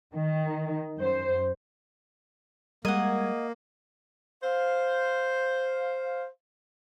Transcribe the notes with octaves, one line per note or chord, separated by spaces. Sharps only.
D#3
F#2 C5
G3 G#3 A#3 A#4 D#5 F#5 G#6
C5 F5